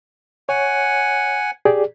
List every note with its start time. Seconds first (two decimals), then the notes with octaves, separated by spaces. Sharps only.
0.49 C#5 F#5 G#5
1.65 G4 G#4 D5